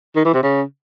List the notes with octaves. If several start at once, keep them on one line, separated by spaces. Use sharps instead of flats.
D#3
E3
C3
C#3